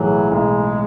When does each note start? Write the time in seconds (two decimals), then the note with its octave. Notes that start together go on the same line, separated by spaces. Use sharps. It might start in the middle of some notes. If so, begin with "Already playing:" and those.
Already playing: B1 A2 E3 F#3 G#3
0.31 B1 G#3